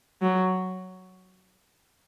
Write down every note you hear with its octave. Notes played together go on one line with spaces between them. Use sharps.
F#3